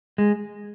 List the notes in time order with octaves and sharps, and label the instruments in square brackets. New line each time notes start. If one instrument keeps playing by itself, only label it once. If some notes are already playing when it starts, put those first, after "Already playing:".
[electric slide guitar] G#3